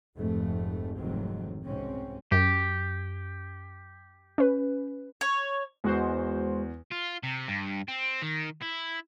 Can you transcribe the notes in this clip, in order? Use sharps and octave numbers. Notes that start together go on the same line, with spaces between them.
F1 F2 G#2 A3
F1 D2 G#2 D#3 F#3 C4
C2 G#2 B2 C4 C#4
F#2 G4
C#4 B4
C#5
E2 G#3 F#4 C5
F4
C3
G2
C4
D#3
E4